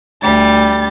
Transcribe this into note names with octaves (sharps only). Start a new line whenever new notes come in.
D2 G3 A6